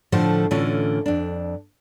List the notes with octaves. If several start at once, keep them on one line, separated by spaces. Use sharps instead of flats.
A2 D3 F3 A3 C5
A2 D3 E3 C#4 F4
F2 D4